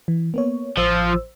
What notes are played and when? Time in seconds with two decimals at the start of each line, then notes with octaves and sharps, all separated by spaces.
0.08 E3
0.34 A#3 B3 C#5
0.77 A1 F3 C5 E6